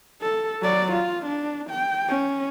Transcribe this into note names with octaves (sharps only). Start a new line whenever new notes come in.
A4
F#3 D5
F4
D4
G5
C#4